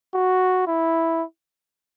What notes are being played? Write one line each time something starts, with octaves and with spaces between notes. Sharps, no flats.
F#4
E4